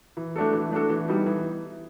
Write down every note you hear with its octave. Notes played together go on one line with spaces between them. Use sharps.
E3
A3 D4 F#4 A4
E3
A3 D4 F#4 A4
E3
G3 B3 D#4
E3